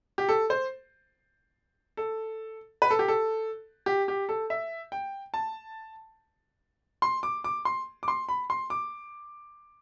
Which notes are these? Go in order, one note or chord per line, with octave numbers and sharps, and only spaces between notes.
G4
A4
C5
A4
B4
A4
G4
A4
G4
G4
A4
E5
G5
A5
C6
D6
D6
C6
D6
C6
B5
C6
D6